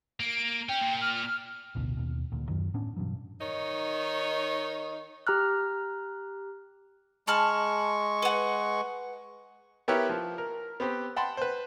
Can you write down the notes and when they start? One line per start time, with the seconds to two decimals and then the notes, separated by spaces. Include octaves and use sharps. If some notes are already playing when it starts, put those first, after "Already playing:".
0.20 A#3 D7
0.69 C#4 G5
0.81 A#2
1.01 F6
1.75 A1 D2 B2
1.97 D#2 B2
2.32 D2 A#2
2.48 F#2 D#3 F#3
2.74 A2 B3 C#4 D4
2.96 G2 B2 E3 F#3
3.40 D#3 D#4 C#5
5.27 G4 A#5 F6 F#6
7.27 G#3 A5 B5 C#6 F6
8.22 B4 F#5
9.88 B3 E4 G4 A#4 B4 C#5
10.10 F3
10.38 A#4
10.80 B3 C4 G4
11.16 F#5 G5 A5 B5 C6
11.37 B4 C5